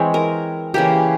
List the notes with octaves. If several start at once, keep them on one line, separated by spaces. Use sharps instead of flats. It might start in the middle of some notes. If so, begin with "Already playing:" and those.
Already playing: E3 G#3 C4 C#5
A#4
C#3 E3 A#3 G4